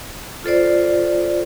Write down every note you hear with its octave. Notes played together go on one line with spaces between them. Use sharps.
F4 A4 C5 D5